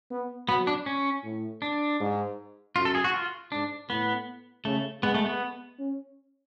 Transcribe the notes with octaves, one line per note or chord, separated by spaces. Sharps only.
B3
F#3 B3
D4
C#4
A2
D4
G#2
F#2 F4
A4
G#4
F#4
F4
G#2 D4
A2 B3
C#3 A3
G#3 B3
A3
B3
C#4